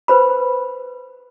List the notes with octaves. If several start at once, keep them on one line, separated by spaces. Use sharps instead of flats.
B4 C5 B5